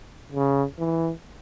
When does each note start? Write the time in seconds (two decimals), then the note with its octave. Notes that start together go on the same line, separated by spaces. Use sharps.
0.32 C#3
0.79 E3